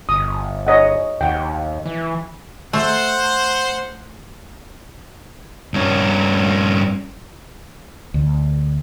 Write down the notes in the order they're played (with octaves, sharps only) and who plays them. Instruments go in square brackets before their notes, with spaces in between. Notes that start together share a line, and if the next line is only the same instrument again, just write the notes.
[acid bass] G1 [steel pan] D#6
[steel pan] C#5 D#5 F#5
[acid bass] D#2 [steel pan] F#5 G5
[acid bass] E3
[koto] A3 [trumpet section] C5 F#5
[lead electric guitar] G2 C#4
[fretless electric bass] D2